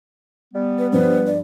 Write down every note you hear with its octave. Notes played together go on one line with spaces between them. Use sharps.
G3 B3
B4
G2 F3 B4 C5
D5